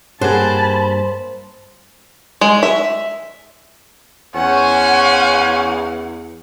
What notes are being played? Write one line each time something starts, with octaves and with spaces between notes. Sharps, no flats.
G2 A#3 G#4 C5 F#5 A5 B5
G#3
E5
E2 C#4 C5 F#5 G#5